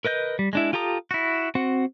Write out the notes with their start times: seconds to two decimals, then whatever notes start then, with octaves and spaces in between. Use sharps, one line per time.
0.05 A#4 B4 D#5 G6
0.39 G3
0.53 G#3 D4 E4
0.73 F4 G4 A4 A#5 D#6
1.11 E4 F#4
1.55 C4 F#4 F#5